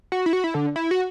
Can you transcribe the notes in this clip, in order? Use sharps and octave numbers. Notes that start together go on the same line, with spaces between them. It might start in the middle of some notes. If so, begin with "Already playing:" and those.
F#4
E4
F#4
E4
D3
E4
F#4